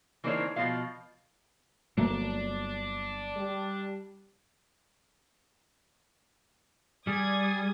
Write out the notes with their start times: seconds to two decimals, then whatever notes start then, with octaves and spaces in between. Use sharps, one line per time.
0.24 E3 A#3 D4 D#4 C5 C#5
0.56 B2 F3 G#3 C4 D#5 F5
1.98 G1 F#3 A3 A#3 D4
3.37 G3
7.07 G3 G#4 D5 D#6 G#6